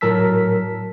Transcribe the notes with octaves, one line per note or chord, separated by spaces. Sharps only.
A2 F#3 A#4 A5 E6 B6